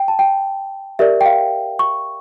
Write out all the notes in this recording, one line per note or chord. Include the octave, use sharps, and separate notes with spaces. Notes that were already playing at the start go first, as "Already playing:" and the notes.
Already playing: G5
A5
G5
G4 A#4 D5 E5
G5
F5
C#6